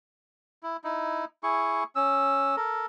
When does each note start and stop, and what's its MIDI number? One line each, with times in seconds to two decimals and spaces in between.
0.63 0.77 64
0.84 1.25 63
0.84 1.25 64
1.43 1.83 64
1.43 1.83 68
1.43 1.83 85
1.96 2.56 61
1.96 2.56 88
2.57 2.86 69
2.57 2.86 70